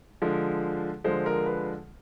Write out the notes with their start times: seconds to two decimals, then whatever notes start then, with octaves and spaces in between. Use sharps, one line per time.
0.22 D3 F3 G#3
1.04 D3 F3 G#3 C5
1.26 A#4
1.46 B4